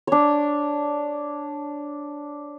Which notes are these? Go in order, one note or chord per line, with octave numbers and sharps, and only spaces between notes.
D4 C#5